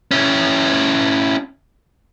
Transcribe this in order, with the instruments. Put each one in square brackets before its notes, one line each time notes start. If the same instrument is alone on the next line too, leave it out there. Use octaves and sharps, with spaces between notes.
[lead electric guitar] C#4 E4